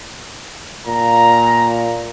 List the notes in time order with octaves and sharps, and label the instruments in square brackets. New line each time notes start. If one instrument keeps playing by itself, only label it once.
[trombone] A#2 [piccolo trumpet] A#5